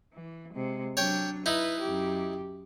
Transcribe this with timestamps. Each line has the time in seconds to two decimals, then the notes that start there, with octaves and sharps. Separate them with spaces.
0.13 E3
0.54 C3 G#3
0.97 F#3 D4 C#5 G5
1.46 D#4 E4 B4
1.80 F#2 G4